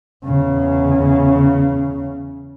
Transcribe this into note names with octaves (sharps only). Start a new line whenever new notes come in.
E2 C#3